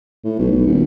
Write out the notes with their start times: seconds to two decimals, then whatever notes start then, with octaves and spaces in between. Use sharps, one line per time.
0.24 A2
0.39 B1
0.51 B1
0.67 D#1